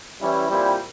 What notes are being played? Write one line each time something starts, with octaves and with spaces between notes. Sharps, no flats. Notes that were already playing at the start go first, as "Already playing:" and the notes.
E3 G3 C#4 E4
A#2 G3 C4 E4